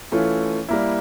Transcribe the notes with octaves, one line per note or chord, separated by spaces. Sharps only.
E3 A3 C#4 F4
G3 A#3 E4